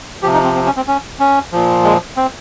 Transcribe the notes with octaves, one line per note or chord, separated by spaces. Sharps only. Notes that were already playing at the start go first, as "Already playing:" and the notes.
C3 F3 G4
D#4
C4
C4
C#4
C4
C#4
C#4
A#2 F3
G#3
C4